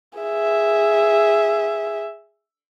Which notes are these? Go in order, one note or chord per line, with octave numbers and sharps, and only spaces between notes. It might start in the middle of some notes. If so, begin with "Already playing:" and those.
G#4 E5